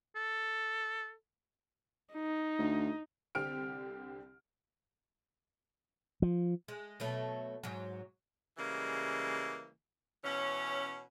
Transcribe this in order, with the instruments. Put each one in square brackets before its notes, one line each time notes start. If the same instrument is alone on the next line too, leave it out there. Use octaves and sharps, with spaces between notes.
[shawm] A4
[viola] D#4
[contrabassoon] D2
[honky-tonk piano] C2 D3 C4 G4 F6 D7
[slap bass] F3
[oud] G#3
B2 F#3 A3
G#2 F#3
[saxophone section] C#3 E3 G3 G#3 A#3
B2 E3 C#4